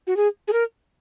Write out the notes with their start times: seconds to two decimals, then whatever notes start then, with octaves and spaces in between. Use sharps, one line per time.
0.07 F#4
0.17 G#4
0.48 G#4
0.53 A#4